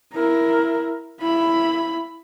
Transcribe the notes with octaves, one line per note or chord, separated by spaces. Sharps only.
E4 A#4
E4 B5